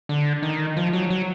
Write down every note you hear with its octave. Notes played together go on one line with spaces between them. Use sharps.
D3
D#3
F3
F#3
F#3